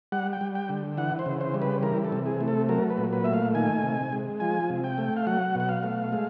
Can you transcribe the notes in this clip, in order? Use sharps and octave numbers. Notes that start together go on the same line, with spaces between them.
G3 F#5
G5
G3
G5
D3
E3 F#5
C5
C#3
C5
G3
B4
E3 A#4
A4
C3
G#4
A3
A4
F#3 A#4
B4
A#2
B4
A3 E5
F5
D#3 G#5
C3
G#3
F3 G#5
C3
G5
A3
F5
F#3 F#5
B2 F#5
F5
A3
G#3